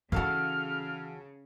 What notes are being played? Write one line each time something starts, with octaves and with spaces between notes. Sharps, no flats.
C#3 E3 D#4 F#4 A4 F5 F6